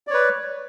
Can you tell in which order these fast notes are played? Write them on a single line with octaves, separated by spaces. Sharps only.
D5 C#5 B4